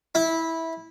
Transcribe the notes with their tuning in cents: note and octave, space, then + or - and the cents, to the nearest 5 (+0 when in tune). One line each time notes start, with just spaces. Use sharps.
E4 -15